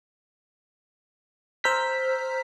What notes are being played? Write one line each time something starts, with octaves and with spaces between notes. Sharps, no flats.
C5 A#5 E6 F6 G6 B6